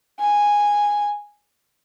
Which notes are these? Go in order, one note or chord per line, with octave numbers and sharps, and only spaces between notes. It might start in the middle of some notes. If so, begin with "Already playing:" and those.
G#5